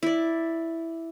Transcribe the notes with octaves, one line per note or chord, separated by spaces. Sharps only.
E4 D5